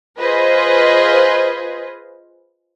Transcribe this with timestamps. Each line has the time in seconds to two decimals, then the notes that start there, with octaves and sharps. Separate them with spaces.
0.19 F4 G#4 B4 C5 D#5